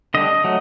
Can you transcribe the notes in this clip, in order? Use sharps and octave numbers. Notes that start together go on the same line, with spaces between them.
D3 G3 D4 D#5
F#3 A3